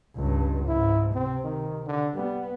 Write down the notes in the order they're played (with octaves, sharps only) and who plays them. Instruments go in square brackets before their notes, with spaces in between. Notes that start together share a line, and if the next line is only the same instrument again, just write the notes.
[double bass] C#2 G2
[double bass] G#2 [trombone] E4
[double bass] C3 [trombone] C4
[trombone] D#3
D3
[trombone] G3 [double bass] B3